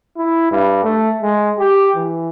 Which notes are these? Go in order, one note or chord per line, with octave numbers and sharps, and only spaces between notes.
E4
G2
A3
G#3
G4
E3